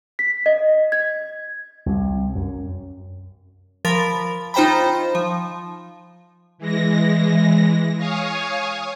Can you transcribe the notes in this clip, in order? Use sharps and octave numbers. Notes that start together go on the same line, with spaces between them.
B6
D#5
G#6
C2
F#2
F3 A#4 B5 A6
D#4 F4 C5 G5 A#5 B5
F3
E3 G#3 A#6
C#5 F5 G#5 C#6 D#6